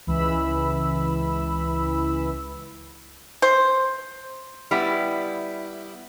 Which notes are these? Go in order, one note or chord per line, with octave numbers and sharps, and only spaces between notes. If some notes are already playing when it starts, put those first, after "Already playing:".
C#2 E3 B5 E6
C5
G3 B3 E4